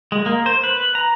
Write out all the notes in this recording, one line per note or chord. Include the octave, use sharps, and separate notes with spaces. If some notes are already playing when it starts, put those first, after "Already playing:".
G#3
A#3
C5
B4
A#5